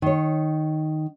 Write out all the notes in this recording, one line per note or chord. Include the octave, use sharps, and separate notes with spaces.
D#3 C#5